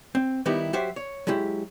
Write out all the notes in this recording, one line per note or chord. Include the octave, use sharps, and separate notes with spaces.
C4
D#3 G3 B3 D#4 E4 G4
F#3 F#4 G4 C5 E5
C#5
F#3 G#3 E4 G4